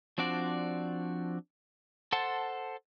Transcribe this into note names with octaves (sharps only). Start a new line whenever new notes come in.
F3 C4 D4 F#4 D5
A4 C5 F#5 A5 C6